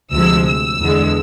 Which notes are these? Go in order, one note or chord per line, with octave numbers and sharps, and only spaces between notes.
D2 C3 F3 G#3 E6
E6
E2 D3 G#3